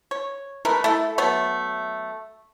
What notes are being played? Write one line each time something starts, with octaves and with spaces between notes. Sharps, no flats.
C#5
G#3 A3 A#4 B4
A3 E4 A4
F#3 A3 B3 C#5